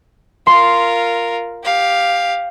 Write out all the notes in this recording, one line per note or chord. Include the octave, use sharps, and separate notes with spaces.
F4 A#4 C6
G4 F5